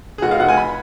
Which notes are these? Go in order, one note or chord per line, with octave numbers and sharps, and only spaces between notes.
G#4
F1 F#4
F5
F1 F#5
G#5
B5